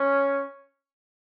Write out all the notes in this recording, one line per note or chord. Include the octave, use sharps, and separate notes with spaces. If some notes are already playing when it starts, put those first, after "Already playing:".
Already playing: C#4